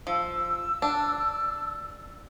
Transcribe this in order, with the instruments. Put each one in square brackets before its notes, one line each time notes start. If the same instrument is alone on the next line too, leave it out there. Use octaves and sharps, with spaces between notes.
[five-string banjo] F3 [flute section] E6
[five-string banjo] D4